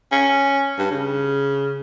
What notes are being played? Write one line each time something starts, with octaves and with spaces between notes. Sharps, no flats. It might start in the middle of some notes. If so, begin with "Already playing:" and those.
C#4
G2
C#3